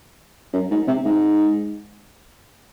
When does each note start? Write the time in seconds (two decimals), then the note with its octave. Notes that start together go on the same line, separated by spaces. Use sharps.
0.53 F#2
0.71 G#2
0.88 C3
1.05 G#2